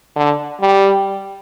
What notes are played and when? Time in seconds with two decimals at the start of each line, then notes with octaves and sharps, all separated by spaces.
0.16 D3
0.62 G3